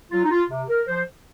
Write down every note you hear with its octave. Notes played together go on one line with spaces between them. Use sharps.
F#3 F4
D#4
F4
C3
A#4
F3 C5